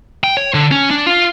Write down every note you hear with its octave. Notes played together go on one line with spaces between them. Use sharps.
G5
C#5
D3
C#4
D4
F4